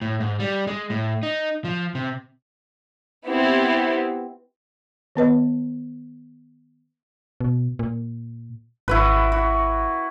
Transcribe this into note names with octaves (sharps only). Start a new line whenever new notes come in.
A2
G#2
G3
G#3
A2
D#4
F3
C3
B3 C4 E4 G4
D#3 B3 B4 D#5
B2
A#2
G#1 E4 F#4 B4
F#4